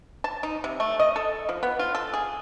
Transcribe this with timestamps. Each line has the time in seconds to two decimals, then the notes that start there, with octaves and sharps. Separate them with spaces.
0.24 A5
0.43 D#4
0.64 C3
0.80 A3
0.99 D#5
1.16 A4
1.49 F3
1.63 B3
1.79 F4
1.95 A4
2.13 G#4